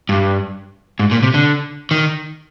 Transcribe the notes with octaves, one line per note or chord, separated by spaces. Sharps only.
G2
G#2
A#2
C3
D3
D#3